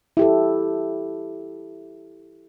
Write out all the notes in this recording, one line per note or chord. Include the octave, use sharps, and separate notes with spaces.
E4 G4 A4